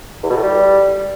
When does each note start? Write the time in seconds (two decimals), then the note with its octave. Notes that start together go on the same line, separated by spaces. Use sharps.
0.23 E2
0.30 B2
0.36 A2
0.43 G3